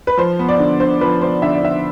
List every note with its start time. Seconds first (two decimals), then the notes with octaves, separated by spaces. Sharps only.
0.07 B4
0.17 F3 C5
0.39 B3
0.49 D5
0.59 D3
0.80 D3 C5
1.01 F3 B4
1.21 B3 C5
1.42 D3 E5
1.53 D5
1.63 D3 E5